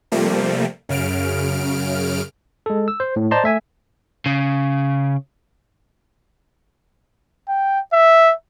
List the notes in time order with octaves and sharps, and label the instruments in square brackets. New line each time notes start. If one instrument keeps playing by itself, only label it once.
[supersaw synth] C3 F3 G3 A3 A#3
F#2 C#3 F6 D7
[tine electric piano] G#3 A4
E6
C5
A2
C5 D5 D#5 A5 A#5 C6
A3 E5 G#5
[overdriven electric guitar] C#3
[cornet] G5
E5